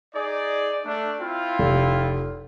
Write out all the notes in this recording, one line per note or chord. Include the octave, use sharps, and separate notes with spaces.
D#4 G#4 D5
A3 D4
C4 E4 F4
F1